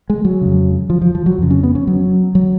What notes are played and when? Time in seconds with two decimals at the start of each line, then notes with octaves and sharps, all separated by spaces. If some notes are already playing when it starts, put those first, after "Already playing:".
0.10 G#3
0.25 F#3
0.41 F2 C#3
0.90 F3
1.01 F3
1.15 F3
1.26 F#3
1.38 F2 C#3
1.50 C#4
1.63 B3
1.75 C#4
1.87 F#3
2.35 F#3